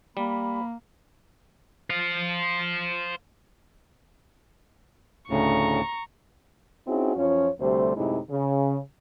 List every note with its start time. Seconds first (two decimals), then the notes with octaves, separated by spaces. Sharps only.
0.17 G3 A#3 B5
1.90 C5 F5
5.30 D2 A2 C#3 A#5 C#6
6.87 C4 C#4 D#4 E4 F#4 G#4
7.16 F#2 F3 C#4 F4 C#5
7.59 D2 C3 G3 A3 C5
7.96 F#2 A2 C3 G#3 D#4 E4
8.30 C#3